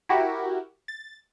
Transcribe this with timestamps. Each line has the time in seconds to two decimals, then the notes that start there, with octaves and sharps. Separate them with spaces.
0.09 E4 F#4 G4 A#4
0.88 A6